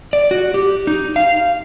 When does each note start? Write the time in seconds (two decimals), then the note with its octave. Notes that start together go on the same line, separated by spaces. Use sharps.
0.13 D5
0.31 F#4
0.54 G4
0.87 D#4
1.16 F5